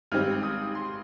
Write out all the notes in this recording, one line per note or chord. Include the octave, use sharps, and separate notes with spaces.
G#1 G#2 G3 C4 F6
D#6
C6